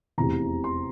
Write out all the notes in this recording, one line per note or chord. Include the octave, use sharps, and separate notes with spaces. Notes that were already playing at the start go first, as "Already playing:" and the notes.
F1 E2 C3 E3 A#5
C6